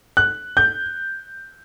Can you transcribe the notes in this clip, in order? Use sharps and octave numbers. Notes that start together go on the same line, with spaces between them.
F#6
G6